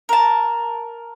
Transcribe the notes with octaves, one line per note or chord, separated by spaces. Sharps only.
A#4 A5